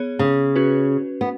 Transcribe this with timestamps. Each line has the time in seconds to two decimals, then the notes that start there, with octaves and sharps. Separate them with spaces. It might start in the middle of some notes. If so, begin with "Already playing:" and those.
Already playing: B3 G#4 C#5
0.19 C#3
0.56 C#4 F#4 B4
1.21 B3